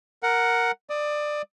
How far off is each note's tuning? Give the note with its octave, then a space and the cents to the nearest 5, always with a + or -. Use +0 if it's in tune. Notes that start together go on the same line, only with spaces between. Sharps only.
A#4 +0 F#5 +0
D5 +20 D#6 +20